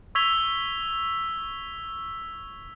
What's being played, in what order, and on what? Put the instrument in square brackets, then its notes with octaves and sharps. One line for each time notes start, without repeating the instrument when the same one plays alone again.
[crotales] C#6 E6 G#6 B6 F7 G7